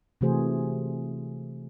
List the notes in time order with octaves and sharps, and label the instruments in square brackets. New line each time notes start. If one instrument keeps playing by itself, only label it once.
[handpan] C3 E3 A3 F#4 G#4 C5